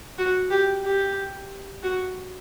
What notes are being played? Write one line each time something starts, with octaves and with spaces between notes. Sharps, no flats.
F#4
G4
G4
F#4